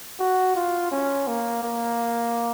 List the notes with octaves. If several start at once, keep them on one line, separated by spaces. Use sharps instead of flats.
F#4
F4
C#4
A#3
A#3